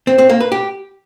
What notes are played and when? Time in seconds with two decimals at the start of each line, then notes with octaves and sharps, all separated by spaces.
0.07 C4
0.18 C4
0.29 A#3
0.41 B4
0.52 G4